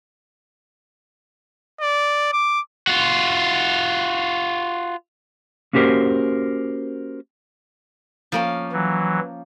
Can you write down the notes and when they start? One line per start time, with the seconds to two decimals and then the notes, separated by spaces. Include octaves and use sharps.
1.81 D5
2.33 D6
2.87 F4 F#4
5.73 A#3 C#4 F#4 G4 A#4 C5
8.32 F3 A#3 C#4
8.72 E3 F#3